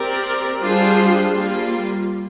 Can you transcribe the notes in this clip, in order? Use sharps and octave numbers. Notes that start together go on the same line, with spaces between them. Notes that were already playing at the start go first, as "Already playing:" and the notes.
Already playing: C4 G4 A#4 D5
G3 D4 F4 G#4 C5
G3 A#3 F4